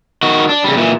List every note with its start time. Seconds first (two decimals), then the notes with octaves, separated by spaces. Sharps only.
0.23 D#3 F#4
0.49 D4
0.64 C#3 G3
0.77 A#2 E3